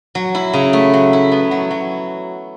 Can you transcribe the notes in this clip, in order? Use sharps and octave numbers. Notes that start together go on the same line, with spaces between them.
F#3
E4
C#3
A3
F#3
E4
B3
F#3
F#3